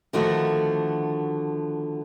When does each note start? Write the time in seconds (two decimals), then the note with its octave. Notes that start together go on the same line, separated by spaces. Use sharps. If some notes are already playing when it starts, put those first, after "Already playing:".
0.13 D3 D#3 F3 A3 B3 F#4